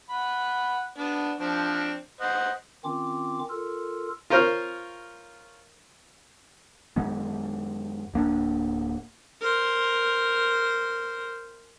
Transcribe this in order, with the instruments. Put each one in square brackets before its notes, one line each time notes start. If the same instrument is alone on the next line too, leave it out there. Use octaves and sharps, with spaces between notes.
[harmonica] F#5 B5
B3 D4
F3 C4 D4
C5 D#5 F#5
[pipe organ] D#3 C4 C#4 F4 D6
F4 A4 A#4
[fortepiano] F4 A#4 C5 C#5
[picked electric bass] F#2 D#3 G#3 B3
D1 A#3 D4
[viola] A#4 C5